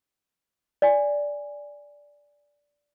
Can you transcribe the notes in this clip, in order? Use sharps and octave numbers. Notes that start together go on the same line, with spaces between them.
D5 G#5